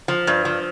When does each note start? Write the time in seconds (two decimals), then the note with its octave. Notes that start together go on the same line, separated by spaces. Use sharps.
0.08 F3
0.27 G2
0.45 F3